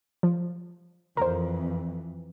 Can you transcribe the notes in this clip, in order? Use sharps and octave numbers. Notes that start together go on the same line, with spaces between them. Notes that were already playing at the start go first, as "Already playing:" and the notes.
F3
F2 E3 A#4 C5